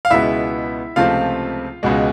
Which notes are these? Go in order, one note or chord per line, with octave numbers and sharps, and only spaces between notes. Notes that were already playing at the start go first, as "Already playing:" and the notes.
F5
C#2 B2 G#3 B3 E4 E5
C#2 C3 F3 A3 C4 F4 F5
C#2 B2 G#3